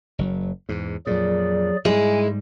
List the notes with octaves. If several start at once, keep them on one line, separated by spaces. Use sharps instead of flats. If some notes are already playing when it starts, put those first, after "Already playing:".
F#1 F#3
E2 G#2
F2 A#2 F#3 G#4 D5
G#2 G3 G#3 E4 G#5